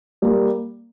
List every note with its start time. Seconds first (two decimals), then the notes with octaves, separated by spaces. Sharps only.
0.22 G3 A#3